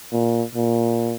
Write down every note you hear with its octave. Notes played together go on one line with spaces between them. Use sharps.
A#2
A#2